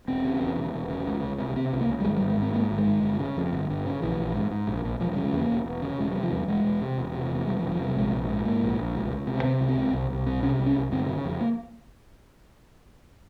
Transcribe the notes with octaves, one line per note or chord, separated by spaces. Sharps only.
E1 C4
C#3
E2
E1
E1
C#3
C#2
C#2
C3
C3 C4
C#2
A#3
C#2
G3
G#1 G#3
G3
G#1
G#3
G#2
C4
G#2 A#3
G#1
G#3
G#1
G1
C#3
F2
G1
G1
C#3
A#1 E3
A#1
G#2
G#2
A#1
A#1
E1 F3
G3
C#3
G#3
E2 A#3
E1
E1
C#3
E1 G#3
G3
C3
F3
E2 G3
E1 G#3
E1
C3
E1
C3
E2
E1 G3
F3
E1
F3
C3 G3
A#1 G#3
A#1
G#2
G#2 A#3
A#1
A#1
C#2
C#2
C3
C3 C4
C#2
C4
C#2
C2
C2
C3
C3 C#4
C2
C#4
C2
G1 C4
C#3
C#4
F2
A#3